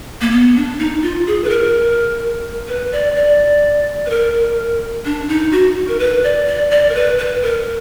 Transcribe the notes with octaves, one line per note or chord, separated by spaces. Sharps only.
A#3
B3
D4
D#4
F4
G#4
B4
A#4
B4
D5
D5
B4
A#4
D4
D#4
F#4
A#4
B4
D5
D5
D5
A#4
B4
B4
A#4